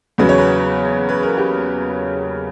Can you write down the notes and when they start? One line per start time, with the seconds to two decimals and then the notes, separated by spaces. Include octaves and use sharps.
0.18 E2 C#3 F#3 B4
0.29 C#5
0.38 B4
1.09 B4
1.23 A#4
1.37 G4